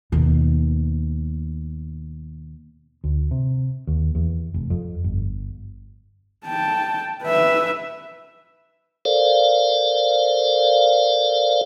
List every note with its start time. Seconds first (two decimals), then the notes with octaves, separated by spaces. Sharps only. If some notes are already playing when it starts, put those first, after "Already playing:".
0.12 D#2 B2
3.04 D2
3.31 C3
3.87 D#2
4.15 E2
4.54 F1
4.70 F2
5.04 G1
6.45 G5 A5
7.23 B4 E5
9.05 A4 A#4 C5 D5 F5